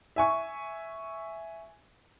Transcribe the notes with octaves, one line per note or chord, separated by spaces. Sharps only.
E5 G#5 C#6